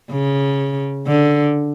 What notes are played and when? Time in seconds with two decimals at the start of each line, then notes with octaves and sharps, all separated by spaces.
0.11 C#3
1.07 D3